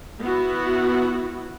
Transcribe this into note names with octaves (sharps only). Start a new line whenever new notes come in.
B3 E4 F#4